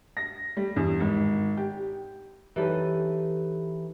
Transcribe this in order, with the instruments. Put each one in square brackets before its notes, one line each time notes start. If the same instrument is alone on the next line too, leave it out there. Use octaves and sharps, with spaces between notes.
[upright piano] A#6
G3
E2
G#1
G4
[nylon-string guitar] E3 D#4 G4 A4 C#5